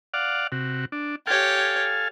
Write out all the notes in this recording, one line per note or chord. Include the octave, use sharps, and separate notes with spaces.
D5 F5 F#5
C3 F#4
D4
G4 A4 C#5 F5 G#5